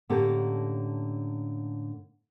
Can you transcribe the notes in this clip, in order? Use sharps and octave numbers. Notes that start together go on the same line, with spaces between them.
A2 D3 A#3 C#4 G4 A4